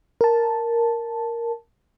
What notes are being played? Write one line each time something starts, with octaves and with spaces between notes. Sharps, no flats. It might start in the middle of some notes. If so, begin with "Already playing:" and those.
A#4 A5